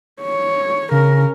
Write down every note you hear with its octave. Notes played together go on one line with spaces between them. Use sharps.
C#5
C#3 C#4 A#4